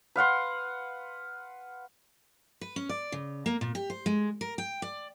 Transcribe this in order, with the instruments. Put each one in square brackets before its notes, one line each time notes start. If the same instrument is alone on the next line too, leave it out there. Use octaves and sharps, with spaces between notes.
[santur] B4 F5 F#5 C6
[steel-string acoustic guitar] B4
C#4
D5
C#3
A#3
A#2
G4
C5
G#3
A#4
G5
D5